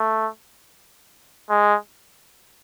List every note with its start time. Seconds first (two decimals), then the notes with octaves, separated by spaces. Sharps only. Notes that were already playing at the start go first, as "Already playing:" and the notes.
Already playing: A3
1.50 G#3